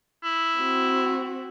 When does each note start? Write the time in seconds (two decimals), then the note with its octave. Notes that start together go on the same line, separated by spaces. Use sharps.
0.24 E4
0.59 C4 F#4